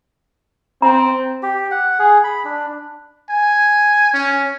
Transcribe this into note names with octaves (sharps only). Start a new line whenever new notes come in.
C4 A#5
G4
F#5
G#4
B5
D4
G#5
C#4